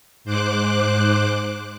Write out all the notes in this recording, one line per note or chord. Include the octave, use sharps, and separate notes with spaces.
G#2 C5 D6 F#6